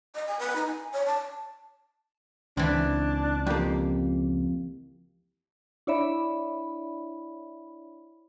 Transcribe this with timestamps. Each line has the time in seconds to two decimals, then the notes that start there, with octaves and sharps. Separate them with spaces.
0.15 D#5
0.28 G#5
0.39 B4
0.56 D#4
0.67 G#5
0.93 C#5
1.06 A5
2.57 C#2 E3 C4 D4
3.47 F2 A#3 G4
5.87 D4 E4 C#5 D5 E5 B5